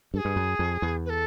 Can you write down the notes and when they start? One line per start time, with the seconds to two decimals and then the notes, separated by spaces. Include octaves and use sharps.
0.14 G2 A4
0.18 G#4
0.25 G2
0.36 F#2
0.59 F2
0.82 E2
1.05 B4
1.09 A4